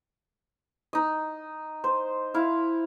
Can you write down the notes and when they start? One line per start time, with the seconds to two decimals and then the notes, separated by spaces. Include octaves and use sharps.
0.93 D#4 D#5
1.84 C5
2.34 E4 F5